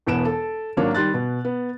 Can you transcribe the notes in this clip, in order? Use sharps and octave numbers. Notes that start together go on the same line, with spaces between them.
E1 E2 B3 B4 D7 E7
A4
G#1 F#3 A#3 D4 C#5
D#3 G3 C6 F#6 A6
B2
B3